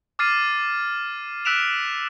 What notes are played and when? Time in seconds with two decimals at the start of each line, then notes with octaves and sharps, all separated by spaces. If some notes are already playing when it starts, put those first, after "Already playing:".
0.19 D6 F6 A6 C7 D#7
1.45 E6 F#6 B6 D7 E7 F7